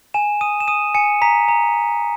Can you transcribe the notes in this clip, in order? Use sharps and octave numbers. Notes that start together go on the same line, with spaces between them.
G#5 E7
D#6 D#7
E7
D#6 D#7
G#5 C#7
A#5 B6
A#5